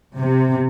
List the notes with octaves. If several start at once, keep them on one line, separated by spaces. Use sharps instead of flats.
C3